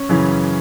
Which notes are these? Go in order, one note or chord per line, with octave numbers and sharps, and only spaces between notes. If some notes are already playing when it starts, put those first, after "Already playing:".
Already playing: C#4 C#5
F#2 C#3 E3